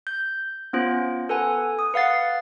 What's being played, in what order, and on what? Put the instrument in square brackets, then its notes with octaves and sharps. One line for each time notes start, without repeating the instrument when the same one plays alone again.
[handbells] G6
B3 C#4 F4 C5
A4 B4 F#5 G#5
D#6
B4 F5 F#5 A6 C7